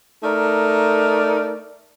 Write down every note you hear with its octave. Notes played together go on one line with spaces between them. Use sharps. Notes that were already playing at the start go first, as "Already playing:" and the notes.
A3 D#4 A#4 D5